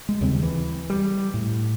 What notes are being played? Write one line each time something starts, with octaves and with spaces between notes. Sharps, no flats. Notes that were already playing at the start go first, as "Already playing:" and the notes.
G#3
D#2 C#3 G3 C4
E3
G3
A2